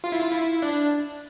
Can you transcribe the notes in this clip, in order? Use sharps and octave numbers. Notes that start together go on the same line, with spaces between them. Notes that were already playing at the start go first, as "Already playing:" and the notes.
F4
E4
F4
E4
D4